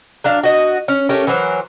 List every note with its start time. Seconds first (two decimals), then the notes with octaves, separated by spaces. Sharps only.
0.24 F#3 D4 F5
0.43 F#4 D#5
0.88 C#4
1.09 A3 C#4 G4 A#4
1.27 E3 F#3 A#4 C5